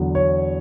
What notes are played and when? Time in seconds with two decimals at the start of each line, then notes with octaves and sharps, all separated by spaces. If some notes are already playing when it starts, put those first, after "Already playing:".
Already playing: E2 D3 F#3
0.15 C#5